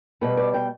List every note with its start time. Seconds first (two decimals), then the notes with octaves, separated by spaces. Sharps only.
0.21 B2 G3 B3 B4
0.37 D5
0.54 G5